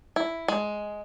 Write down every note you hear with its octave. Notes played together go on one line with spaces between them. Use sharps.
E4
G#3